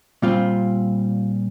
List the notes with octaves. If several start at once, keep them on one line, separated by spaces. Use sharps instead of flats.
A#2 G3 C4 F4